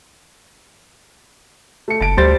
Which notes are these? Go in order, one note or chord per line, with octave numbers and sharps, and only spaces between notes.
A3 C#7
F#1 A5 D7
D2 G3 C5 A6